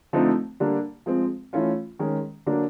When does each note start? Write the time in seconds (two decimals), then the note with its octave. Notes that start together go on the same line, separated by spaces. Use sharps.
0.13 D3 F3 A3 C4 D#4
0.60 D3 G3 A#3 D4
1.06 F3 G#3 C4
1.53 E3 A3 C#4 F4
1.99 D#3 G#3 C#4
2.47 D3 F#3 A#3 D4